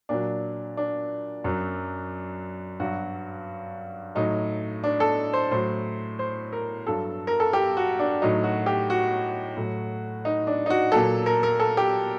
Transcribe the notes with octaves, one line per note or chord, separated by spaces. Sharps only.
A#2 F#3 D4
D4
F#2 F#3
G2 F#3 F#4
A2 F#3 D#4
D4
A4
C5
A2 F#3 C5
C5
A#4
G2 F#3 A4
A#4
A4
G4
F#4
D4
A2 F#3 D#4
F#4
G4
F#4
A2 F#3
D#4
D4
D#4
F#4
A#2 F#3 A4
A#4
A#4
A4
G4